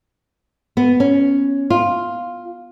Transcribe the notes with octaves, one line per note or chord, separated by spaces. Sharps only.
B3
C#4
F4